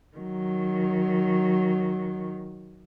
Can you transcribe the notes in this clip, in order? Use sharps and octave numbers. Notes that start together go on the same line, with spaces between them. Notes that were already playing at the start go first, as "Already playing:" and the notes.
D#3 F#3